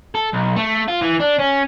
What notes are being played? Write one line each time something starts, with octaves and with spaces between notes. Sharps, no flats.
A4
B1
A3
F4
E3
D4
C#4